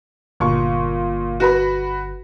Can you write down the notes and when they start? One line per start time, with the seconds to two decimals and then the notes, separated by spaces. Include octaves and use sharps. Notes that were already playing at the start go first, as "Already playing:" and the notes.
0.40 G1 A#2 C#6
1.40 F#4 B4 B5